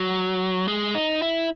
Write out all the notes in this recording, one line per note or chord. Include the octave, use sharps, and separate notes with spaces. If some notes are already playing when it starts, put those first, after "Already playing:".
Already playing: F#3
G#3
D#4
E4